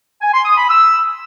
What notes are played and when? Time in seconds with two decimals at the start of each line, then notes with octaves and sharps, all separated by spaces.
0.22 G#5
0.34 C6
0.45 D#6
0.57 B5
0.69 E6